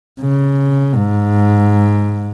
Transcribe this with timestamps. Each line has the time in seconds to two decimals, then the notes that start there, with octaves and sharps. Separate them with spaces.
0.20 C#3
0.95 G#2